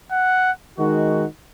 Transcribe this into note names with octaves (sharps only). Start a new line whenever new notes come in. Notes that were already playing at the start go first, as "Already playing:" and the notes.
F#5
D#3 G#3 D#4 F#4